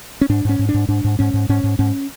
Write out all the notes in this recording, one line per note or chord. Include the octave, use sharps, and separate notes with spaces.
C#4
G#2 D4
G#2 C#4
G#2
D4
G#2
G#2 D4
G#2
G#2 C#4
G#2
G#2 C#4
G#2
G#2 C#4